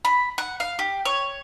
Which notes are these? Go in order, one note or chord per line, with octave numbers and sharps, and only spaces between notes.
B5
F#5
F5
G4
C#5